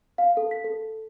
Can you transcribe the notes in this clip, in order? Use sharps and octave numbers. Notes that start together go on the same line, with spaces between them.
F5
A4
B6
A4